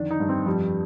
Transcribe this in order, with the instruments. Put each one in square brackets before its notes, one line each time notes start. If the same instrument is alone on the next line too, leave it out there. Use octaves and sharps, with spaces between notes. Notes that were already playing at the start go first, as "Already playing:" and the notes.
Already playing: [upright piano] F2 D3 D#3 D4
D#4
G2
C4
F2 G3